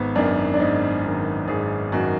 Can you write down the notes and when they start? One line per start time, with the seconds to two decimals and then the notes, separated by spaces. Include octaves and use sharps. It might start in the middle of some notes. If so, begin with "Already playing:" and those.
Already playing: G#1 B3
0.15 F#2 D#3 D4
0.54 D4
0.60 G#1 D#4
1.04 F#2 D#3
1.48 G#1 G#4
1.92 F#2 D#3 F#4